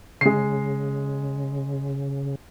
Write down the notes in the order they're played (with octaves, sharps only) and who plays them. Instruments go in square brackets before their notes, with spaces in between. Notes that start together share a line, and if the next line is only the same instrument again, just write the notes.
[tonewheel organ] C#3 [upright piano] G#3 C7